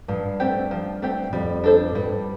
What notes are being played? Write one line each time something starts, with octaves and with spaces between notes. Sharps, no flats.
G2 F3
A3 C4 G4
F3
A3 C4 G4
F2 G3
D4 A4 C5
G2 G3